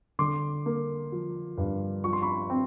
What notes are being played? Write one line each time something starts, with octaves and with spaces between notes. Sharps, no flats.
D3 C6 D6
A#3
F3
G2
F3 C#6
C6
B5 C#6
C4